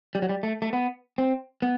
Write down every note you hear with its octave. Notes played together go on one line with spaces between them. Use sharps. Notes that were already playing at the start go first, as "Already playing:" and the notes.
G3
F#3
G3
A3
A3
B3
C4
B3